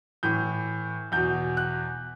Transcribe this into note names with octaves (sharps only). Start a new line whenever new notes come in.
A2 E3 G6
E2 B2 G6
F#6